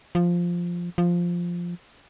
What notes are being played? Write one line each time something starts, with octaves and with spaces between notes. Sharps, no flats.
F3
F3